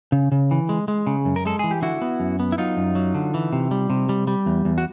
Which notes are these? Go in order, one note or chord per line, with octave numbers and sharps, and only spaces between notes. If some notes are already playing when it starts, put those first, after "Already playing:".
C#3
C#3
E3
G#3
G#3
C#3
F#2
A#4
G#3 A4
E3 G#4
G4
D3 E4 F#4
B3
F#2
B3
E4
F#3 D#4 F4
F#2
F#3
D3
E3
C3
G3
C3
G3
G3
E2
E2
F#4